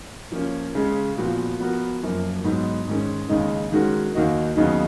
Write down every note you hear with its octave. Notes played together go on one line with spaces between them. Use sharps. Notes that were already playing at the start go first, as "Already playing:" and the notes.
F3 A#3 C#4
C#3 G#3 C#4
A#2 F3 B3 F#4
F3 B3 F#4 A#4
F#2 F3 A#3
G#2 F#3 B3 D#4
G#2 D#3 G#3 C#4
D#2 C#3 G#3 D#4
D#3 G#3 C#4 F#4 A#4
D#2 D#3 A#3 D#4 F#4
D#2 C#3 F#3 B3 D#4